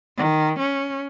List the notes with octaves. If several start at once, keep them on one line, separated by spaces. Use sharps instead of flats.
D#3
C#4